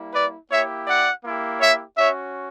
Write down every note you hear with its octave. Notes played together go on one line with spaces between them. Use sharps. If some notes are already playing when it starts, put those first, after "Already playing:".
Already playing: G3 A#3 E4
B4 D5
A#3 E4 G4 C#5 E5
D5 F#5
A#3 E4 G4
C#5 E5
C#4 F#4 C#5 E5